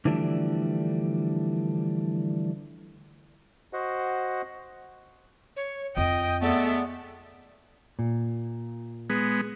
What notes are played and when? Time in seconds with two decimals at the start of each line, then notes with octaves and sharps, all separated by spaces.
0.05 D3 E3 F3 G3 A3 D4
3.73 F#4 C5 D#5 F#5
5.56 C#5
5.97 F2 F4 D#5 G5 D#6
6.42 G#3 A3 B3 A4 D5 E5
7.99 A#2
9.10 G#3 B3